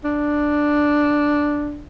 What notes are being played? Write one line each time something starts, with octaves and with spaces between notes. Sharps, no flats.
D4